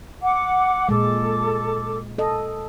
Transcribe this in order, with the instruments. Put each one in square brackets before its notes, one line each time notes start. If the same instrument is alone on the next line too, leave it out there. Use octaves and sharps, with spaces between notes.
[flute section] F#5 D6
[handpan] A#2 G#3 [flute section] A4 D6
[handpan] A4 D#5